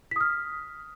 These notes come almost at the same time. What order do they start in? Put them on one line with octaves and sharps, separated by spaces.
B6 D#6 F6